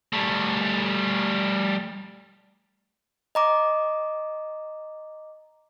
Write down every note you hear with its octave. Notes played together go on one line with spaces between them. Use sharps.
G3 A3
D#5 A#5 D6